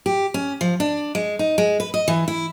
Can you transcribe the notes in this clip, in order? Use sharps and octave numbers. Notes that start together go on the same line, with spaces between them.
G4
C#4
F3
D4
G#3
D#4
G#3
B4
D#5
E3
E4